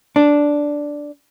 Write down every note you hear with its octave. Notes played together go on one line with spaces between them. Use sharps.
D4